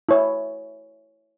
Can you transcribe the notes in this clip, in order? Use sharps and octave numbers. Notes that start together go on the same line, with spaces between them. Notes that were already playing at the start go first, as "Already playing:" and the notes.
E4 C#5